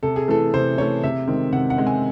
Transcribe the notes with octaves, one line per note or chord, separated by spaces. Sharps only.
C3 A4
G#4
E3 A3 A4
C3 C5
E3 A3 C#5
C3 E5
D#3 G#3 C4
C3 F#5
F#5
D#3 G#3 C4
G#5